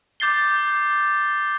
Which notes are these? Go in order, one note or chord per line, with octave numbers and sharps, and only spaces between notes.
D6 G6 A6 C7 G7